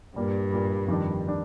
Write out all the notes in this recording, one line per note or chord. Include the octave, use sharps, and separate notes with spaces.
G2 A#2 G3 A#3
A#2 G3 A#3
F2 D#3 G3 D4
D#3 G3 D4